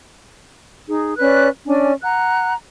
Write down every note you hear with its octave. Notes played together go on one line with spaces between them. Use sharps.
D#4 G#4
C#4 B4 D5 F#6
C#4 D4 D5 G#5
F#5 A#5 F#6